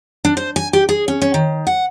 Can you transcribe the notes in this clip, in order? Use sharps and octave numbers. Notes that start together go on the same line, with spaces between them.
D4
C5
G#5
G4
G#4
C#4
C#4
D#3
F#5